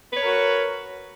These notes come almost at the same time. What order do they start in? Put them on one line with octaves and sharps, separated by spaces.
B4 C#5 A#4 F#4